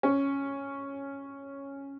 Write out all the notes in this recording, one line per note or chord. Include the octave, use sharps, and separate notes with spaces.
C#4